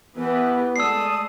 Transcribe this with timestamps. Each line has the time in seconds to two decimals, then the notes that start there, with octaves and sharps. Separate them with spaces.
0.16 E3 B3 G4 B4
0.76 G#3 A3 D5 A5 D#6 E6 C7